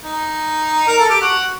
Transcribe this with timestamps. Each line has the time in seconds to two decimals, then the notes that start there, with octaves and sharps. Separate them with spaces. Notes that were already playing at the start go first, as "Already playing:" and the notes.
0.03 D#4
0.87 A#4
0.98 A4
1.09 G4
1.21 F#4